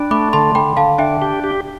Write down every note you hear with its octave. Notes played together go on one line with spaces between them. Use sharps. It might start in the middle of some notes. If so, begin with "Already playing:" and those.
Already playing: D4 G5 B5
A3 B5 D6
D3 A5 C6
D3 G5 B5
D3 F5 A5
D4 E5 G5
G4
G4